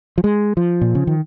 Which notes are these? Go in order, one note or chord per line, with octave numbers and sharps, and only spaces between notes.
F3
G#3
F3
A#2
C#3
D#3